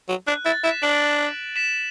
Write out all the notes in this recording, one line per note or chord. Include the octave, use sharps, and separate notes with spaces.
F#3
D4 F#6
E4 A6
E4 B6 E7
D4 D7 F#7
B6 E7